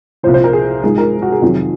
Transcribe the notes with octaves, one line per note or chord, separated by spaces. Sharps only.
C2 A#2 F3 C5
C5
A#4
G#4
G#2 F3 G#3 G#4
A#4
F#4
G#4
F2 C3 D#3 F#3